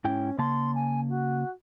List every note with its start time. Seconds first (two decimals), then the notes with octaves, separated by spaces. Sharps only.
0.04 G#2 C#4 E4 G5
0.38 C#3 A#3 A5 C6
0.75 G#5
1.09 F#4